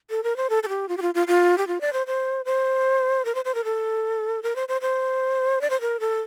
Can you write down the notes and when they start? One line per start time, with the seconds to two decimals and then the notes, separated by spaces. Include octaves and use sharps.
0.10 A4
0.24 A#4
0.37 C5
0.50 A4
0.63 A4
0.69 G4
0.89 F4
0.97 G4
1.02 F4
1.15 F4
1.28 F4
1.58 G4
1.67 F4
1.81 D5
1.93 C5
2.07 C5
2.45 C5
3.25 A#4
3.35 C5
3.45 C5
3.55 A#4
3.65 A4
4.43 A#4
4.56 C5
4.69 C5
4.81 C5
5.61 D5
5.70 C5
5.81 A#4
6.00 A4